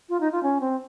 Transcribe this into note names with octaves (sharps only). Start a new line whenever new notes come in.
F4
D#4
F4
C#4
C4